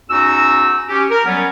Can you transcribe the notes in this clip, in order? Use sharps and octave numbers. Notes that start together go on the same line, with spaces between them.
E2 C#4 D#4 F#4 E6
C#4 G4
A#4
F#3 G3 B3 C#4